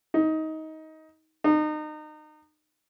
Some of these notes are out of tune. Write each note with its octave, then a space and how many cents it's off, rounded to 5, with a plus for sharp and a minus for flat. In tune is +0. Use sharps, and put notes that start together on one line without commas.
D#4 +20
D#4 -30